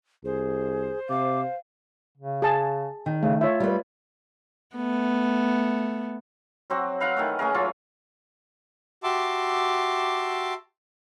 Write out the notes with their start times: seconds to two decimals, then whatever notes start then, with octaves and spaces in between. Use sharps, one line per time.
0.24 C2 G#4 C5
1.09 C3 F5 D6
2.18 C#3
2.42 G#4 A5
3.06 D#3
3.23 C#3 A3
3.41 F4 C#5 E5
3.60 G3 B4
4.76 A3 B3
6.70 F#3 C4 F#4
7.00 B4 F5 F#5 A#5
7.17 D#3 E3 A3
7.39 A3 C#4 G#4 A#4
7.54 F#3 C#4 F4 A4
9.04 F#4 G4 E5 A5 C6 D6